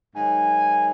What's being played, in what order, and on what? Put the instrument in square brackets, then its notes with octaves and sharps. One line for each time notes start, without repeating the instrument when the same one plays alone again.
[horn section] G#2 D#3 F#3 G#5